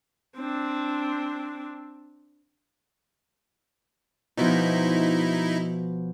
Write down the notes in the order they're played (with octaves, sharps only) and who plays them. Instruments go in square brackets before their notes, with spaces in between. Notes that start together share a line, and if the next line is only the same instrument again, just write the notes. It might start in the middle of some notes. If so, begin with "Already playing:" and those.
[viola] C4 D4
[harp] B2 F3 [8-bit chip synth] D#4 E4